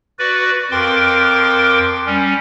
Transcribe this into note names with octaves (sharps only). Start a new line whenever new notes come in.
F#4 B4 D5
F2 A#4 G5 C6 D6
G3 C#4